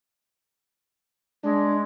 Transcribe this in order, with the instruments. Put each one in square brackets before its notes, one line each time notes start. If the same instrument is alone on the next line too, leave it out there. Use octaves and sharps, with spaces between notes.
[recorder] G#3 [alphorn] D4